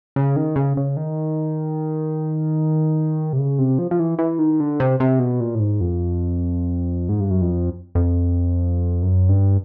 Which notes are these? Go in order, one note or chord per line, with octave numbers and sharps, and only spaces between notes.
C#3
D#3
C#3
C#3
D#3
C3
C#3
C3
F3
F3
E3
E3
D#3
D3
C3
C3
B2
A#2
A2
G#2
F2
G#2
G2
F#2
F2
F2
F#2
G2